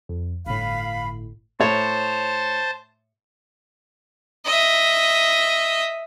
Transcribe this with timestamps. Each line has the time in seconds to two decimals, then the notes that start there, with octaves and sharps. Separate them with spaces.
0.09 F2
0.46 G1 A2 F5 B5
1.60 A2 C5 C#5 A5
4.46 D#5 E5